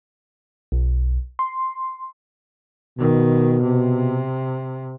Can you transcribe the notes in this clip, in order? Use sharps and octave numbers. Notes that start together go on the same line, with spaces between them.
B1
C6
B2 D#3
C3